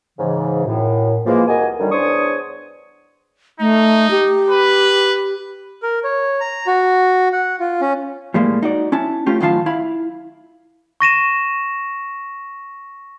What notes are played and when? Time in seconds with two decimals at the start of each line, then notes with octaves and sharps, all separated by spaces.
0.18 G#2 C#3 E3
0.65 F#2 A2
1.26 E3 F3 G#3 A#3
1.47 C2 A#3 F#4 D#5 G#5
1.78 F#2 D3 D#3 G3
1.92 E2 D4 C5 C#5 C#6 D#6
3.60 A3 D#4
4.11 G4
4.50 B4
5.83 A#4
6.04 C#5
6.41 A#5
6.67 F#4
7.33 F#5
7.60 F4
7.81 C#4
8.34 A2 G3 G#3 A#3
8.63 D#4 F#4 D5
8.92 C#4 E4 A5
9.26 A3 C#4 F4 G4
9.40 F#2 A2 D#3 F4 F5 A5
9.66 E4 F5 B5
11.00 C#6 A#6 D#7 E7